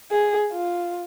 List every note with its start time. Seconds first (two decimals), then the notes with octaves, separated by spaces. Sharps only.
0.11 G#4
0.52 F4